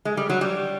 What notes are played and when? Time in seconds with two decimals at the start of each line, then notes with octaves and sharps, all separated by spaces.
0.05 G#3
0.17 G3
0.30 F#3
0.41 G3